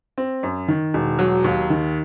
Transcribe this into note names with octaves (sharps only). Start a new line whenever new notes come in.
C4
F#2
D#3
E1
F#3
D#2
D#3